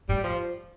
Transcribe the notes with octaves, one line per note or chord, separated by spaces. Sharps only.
A2 G3
F3